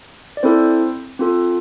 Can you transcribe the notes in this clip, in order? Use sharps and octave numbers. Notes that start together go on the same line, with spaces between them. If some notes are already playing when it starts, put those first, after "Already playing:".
D5
C4 E4 A4 C5
C4 F4 A4